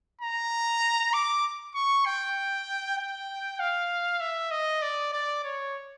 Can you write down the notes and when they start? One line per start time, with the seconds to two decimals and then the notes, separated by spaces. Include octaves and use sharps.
0.21 A#5
1.13 D6
1.75 C#6
2.06 G5
2.98 G5
3.59 F5
4.21 E5
4.51 D#5
4.82 D5
5.13 D5
5.44 C#5